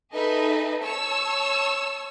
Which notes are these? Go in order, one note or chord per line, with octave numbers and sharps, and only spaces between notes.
D#4 G#4 A4 B4 D#5 E5
C#5 A5 C#6 E6